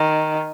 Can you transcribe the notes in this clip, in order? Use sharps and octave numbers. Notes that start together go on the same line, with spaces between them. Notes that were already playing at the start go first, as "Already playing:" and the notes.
Already playing: D#3